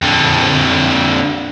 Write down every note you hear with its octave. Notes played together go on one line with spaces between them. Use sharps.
F2 D3